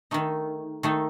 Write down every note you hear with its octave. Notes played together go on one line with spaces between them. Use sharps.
D#3 A3 D#4
D#3 A3 D#4